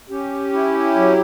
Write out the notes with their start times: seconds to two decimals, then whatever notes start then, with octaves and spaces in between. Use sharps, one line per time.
0.10 C#4 G4
0.53 E4
0.95 F#3